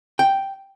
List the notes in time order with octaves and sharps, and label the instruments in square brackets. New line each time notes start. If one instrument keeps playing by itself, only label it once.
[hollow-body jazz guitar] G5